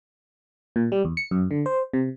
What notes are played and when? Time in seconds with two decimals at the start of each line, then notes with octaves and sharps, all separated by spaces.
0.76 A#2
0.92 G3
1.05 E2
1.17 C#7
1.31 F#2
1.51 D3
1.66 C5
1.93 C3